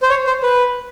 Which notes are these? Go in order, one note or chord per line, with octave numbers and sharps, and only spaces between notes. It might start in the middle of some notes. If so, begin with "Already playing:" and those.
C5
C#5
C5
B4